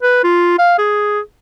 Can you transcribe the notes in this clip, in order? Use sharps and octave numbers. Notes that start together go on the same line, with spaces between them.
B4
F4
F5
G#4